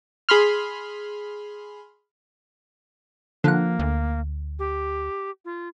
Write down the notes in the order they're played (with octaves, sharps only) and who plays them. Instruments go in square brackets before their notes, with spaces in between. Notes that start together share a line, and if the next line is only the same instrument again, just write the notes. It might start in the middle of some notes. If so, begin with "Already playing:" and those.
[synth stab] G#4 B5 C6 F6
[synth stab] D3 F#5 [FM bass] F3 [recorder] A#3
[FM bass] D2
[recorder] G4
F4